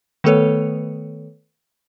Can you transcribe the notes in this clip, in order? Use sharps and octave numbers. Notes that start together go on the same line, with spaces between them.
D#3 A3 B3 A4 B4 C#5